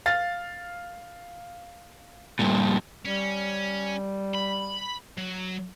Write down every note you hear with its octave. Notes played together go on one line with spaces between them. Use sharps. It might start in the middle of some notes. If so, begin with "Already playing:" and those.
F5 A6
G2 A#2
G3 C#4
B5
F#3